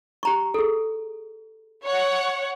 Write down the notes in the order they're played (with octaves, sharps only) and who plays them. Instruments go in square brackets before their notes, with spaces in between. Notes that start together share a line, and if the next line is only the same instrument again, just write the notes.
[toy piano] G4 A#5 C#6
G#4 A4
[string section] C#5 F#5